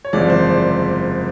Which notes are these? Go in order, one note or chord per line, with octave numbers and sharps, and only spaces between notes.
C#5
F#1 E2 C3 F3 G#3 D5
C5
D5